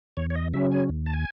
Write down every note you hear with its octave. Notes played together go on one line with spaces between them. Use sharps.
E2 C#5
C#5
D#5
C#3 F#3 C#4 E5
G#5
D#2
A5
G#5